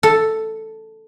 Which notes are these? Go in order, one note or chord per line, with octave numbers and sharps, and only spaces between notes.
A4